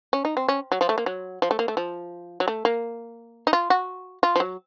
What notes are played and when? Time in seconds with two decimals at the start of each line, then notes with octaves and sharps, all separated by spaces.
0.13 C#4
0.25 D#4
0.37 C4
0.48 C#4
0.72 F#3
0.81 F3
0.89 A3
0.98 A#3
1.06 F#3
1.42 F3
1.51 A3
1.59 A#3
1.68 A3
1.77 F3
2.40 F#3
2.48 A3
2.65 A#3
3.47 D#4
3.53 F4
3.70 F#4
4.23 F4
4.36 F3
4.40 F#3